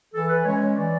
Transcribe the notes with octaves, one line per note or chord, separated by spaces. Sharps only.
E3 A4
B4
G#3 C#4 C#5
E3 D5